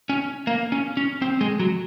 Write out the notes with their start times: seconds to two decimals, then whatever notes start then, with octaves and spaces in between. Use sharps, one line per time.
0.09 C#4
0.47 A#3
0.72 C#4
0.97 C#4
1.22 C4
1.41 G#3
1.60 F#3